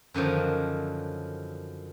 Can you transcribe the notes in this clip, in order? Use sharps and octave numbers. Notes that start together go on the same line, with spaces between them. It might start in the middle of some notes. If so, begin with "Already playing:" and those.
F#2 D3 D#3 F3 F#3